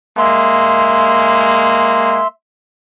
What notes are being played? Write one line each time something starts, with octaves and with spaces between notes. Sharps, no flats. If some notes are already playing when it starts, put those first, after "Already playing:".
G#3 A#3 E5 C6